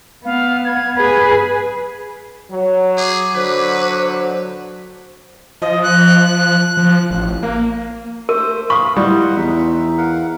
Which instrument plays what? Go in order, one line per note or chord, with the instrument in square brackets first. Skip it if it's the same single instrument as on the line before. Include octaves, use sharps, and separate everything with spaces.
[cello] B3 [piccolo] F5
[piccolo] G#6
[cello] G#4 B4 [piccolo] G#6
[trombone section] F#3 [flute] C#5
[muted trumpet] G#4 [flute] D6
[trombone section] D3 F#3 [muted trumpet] B4 [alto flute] C5
[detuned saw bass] F3 [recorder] D#5
[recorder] F#6
[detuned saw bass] F3
A1
A#3
[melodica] A3 C5 [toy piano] A#4
[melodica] F5 [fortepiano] B5 D#6 [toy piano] C#6
[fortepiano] A2 G3 [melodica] F4 D#5 F#5
[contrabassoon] E2 [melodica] D#4 E5
[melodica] A#4 F5 F#5